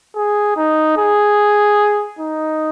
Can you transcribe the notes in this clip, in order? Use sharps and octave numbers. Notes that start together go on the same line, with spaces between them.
G#4
D#4
G#4
D#4